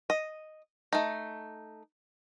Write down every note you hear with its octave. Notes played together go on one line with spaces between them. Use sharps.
D#5
A3 D#4